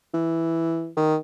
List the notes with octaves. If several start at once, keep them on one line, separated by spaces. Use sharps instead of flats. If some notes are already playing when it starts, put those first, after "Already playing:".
E3
D#3